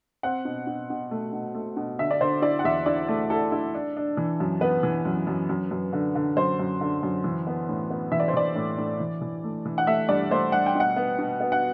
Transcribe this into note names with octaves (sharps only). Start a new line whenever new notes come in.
C4 F#5
B2
B2
B2
A3
B2
A3
B2
D3 E5
D5
D3 C5
E4 D5
F#5
E2 E5
E4 D5
A3
E4 A4
E4
D4
D4
E3
F#2
B3 B4
E3
F#2
F#2
F#2
F#2
D3
D3
F#2 C5
F#2
D3
F#2
E3
B3
A2
B3
E3 E5
D5
C5
E3 D5
A2
A2
E3
E3
A3
E3
F#5
A3 E5
G2 D5
A3 C5
G2 F#5
G5
B2 F#5
B3
B2
B3
F#5